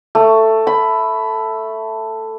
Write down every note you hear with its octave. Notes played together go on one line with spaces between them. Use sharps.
A3
B5